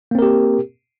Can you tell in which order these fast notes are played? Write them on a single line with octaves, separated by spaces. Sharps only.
A#3 C4 A#4 G4